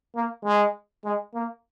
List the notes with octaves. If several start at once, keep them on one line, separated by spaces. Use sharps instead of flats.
A#3
G#3
G#3
A#3